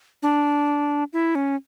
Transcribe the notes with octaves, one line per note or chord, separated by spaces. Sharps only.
D4
E4
C#4